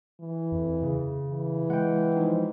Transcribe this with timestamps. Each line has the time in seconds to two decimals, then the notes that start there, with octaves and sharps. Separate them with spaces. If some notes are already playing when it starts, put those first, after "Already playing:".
0.20 E3
0.52 F2
0.83 C#3
1.29 E3
1.70 G#3 F#5 G5
2.17 F3 D#4